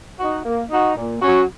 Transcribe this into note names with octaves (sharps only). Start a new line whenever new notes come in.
D#4 F#4
A#3
D#4 F#4
A#2
F#3 C#4 F#4